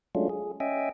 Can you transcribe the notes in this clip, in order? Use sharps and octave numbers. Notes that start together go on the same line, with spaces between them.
F#3 G#3 A3 C#4 D4 F4
G#4
C#4 D#5 E5 G5 G#5